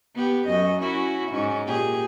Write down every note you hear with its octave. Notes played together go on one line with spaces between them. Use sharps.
B3 G4
F#2 D#5
C#4 E4 F#4
G#2 C#4
A#2 G4 G#4